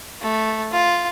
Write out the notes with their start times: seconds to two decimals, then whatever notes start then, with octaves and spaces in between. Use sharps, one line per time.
0.22 A3
0.72 F4